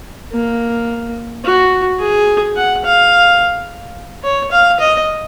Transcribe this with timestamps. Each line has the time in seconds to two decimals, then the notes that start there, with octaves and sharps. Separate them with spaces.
0.32 A#3
1.44 F#4
2.00 G#4
2.56 F#5
2.84 F5
4.23 C#5
4.51 F5
4.80 D#5